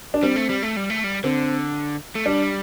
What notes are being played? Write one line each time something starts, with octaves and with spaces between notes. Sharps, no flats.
D4
G3 C4
A3
G3
A3
G3
A3
G3
D3 C4
A3
G3 D4